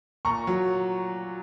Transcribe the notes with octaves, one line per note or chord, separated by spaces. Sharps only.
A#2 A#5 C#6
F#3